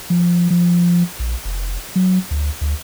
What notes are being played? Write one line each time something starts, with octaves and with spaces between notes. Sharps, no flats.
F3
F3
A#1
F1
F#3
D2
D2